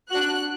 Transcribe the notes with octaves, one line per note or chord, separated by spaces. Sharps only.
D4 F#4 F#6